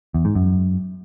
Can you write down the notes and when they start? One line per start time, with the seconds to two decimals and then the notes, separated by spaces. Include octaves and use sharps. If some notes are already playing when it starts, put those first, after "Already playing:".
0.14 E2
0.25 G#2
0.35 F#2